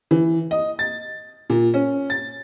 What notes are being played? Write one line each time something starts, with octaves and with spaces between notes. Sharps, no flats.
E3
D#5
A6
A#2
C#4
A6